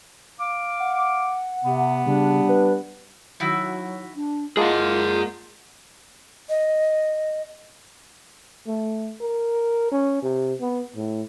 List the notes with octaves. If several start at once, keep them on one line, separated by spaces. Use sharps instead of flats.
F5 D6
F#5
C3 B3
C#3 G3 D4
B4
D#3 F#3 E4 F#4
D4
G#3 A#3 F4 G#4 F#5 A5
D#5
A3
A#4
C#4
C3
B3
A2